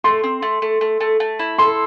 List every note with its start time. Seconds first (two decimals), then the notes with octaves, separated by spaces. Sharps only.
0.04 A3 C6
0.24 C4
0.42 A3
0.62 A3
0.81 A3
1.00 A3
1.20 A3
1.39 E4
1.58 A4 C6